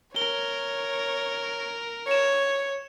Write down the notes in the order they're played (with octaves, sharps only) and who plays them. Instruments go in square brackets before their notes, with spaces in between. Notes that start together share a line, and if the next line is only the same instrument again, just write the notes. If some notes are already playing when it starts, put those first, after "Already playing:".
[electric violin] A#4 [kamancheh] C#5 [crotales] G7
[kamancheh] C#5 [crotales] C#7 E7